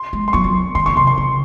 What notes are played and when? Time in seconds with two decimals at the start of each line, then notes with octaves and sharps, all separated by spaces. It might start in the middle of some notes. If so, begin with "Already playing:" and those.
Already playing: C6
0.13 G#3
0.28 C6
0.33 F#3 C#6
0.44 C4
0.75 D#3 C6
0.86 C#3 C#6
0.96 C3 C6
1.07 C6
1.18 C#3